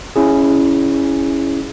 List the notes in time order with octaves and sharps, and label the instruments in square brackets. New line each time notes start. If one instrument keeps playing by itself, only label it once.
[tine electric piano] C#4 E4 G#4